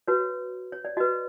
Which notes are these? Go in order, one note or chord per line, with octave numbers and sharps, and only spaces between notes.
F#4 B4 C#5
C#5
D5
F#4 B4 D#5